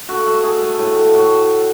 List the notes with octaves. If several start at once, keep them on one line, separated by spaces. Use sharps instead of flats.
A3 F#4
A3
A3 G#4
A3
A2
A3
A2 F#4